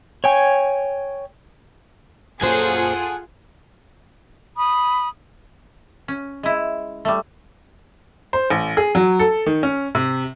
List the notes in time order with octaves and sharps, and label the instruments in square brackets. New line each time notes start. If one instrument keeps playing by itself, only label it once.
[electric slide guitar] C#5 G5 G#5
[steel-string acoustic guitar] A#2 F#4 C5 [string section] F4 G#4 A4 [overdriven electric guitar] F#5 G#5
[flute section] B5 D#6
[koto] C#4
G#3 E4
G3 A3
[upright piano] C5
A1
G#4
F#3
A4
D#3
C#4
C3